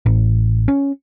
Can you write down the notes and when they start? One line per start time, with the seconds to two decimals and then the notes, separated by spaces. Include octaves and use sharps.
0.06 A1
0.68 C#4